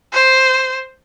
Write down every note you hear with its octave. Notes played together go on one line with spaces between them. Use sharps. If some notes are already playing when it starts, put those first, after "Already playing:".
C5